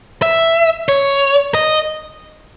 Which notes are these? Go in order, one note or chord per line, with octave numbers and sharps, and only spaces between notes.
E5
C#5
D#5